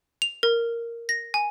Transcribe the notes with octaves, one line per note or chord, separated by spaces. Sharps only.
F7
A#4
A#6
G#5